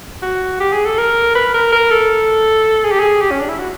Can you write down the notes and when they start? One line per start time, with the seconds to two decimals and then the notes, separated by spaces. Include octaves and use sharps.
0.22 F#4
0.60 G4
0.73 G#4
0.85 A4
0.97 A#4
1.35 B4
1.54 A#4
1.72 A#4
1.90 A4
2.84 G#4
2.92 G4
3.00 G#4
3.21 G4
3.31 C#4
3.40 D4
3.49 E4
3.59 F#4